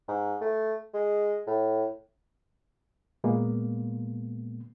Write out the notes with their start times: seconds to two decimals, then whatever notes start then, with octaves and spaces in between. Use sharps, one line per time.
0.08 G#2
0.41 A3
0.94 G#3
1.47 A2
3.24 A#2 G#3 A#3 B3